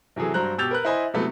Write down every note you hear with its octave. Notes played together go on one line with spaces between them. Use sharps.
C3 E3 F#3 G#4 A4
G2 F#3 C5 A#5 F#6
B2 G4 E6 G6 A6 F7
A#4 B4 F#6
E4 C5 D#5 G#5 B5
C3 F#3 A3 B3 E4